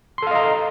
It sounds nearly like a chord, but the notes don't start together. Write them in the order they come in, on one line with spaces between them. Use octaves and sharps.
C6 A4 F5 D#5 A#5